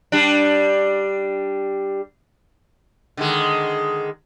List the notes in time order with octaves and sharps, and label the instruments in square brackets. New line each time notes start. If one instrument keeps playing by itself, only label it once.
[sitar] G3 D4
D3 D#3 G#3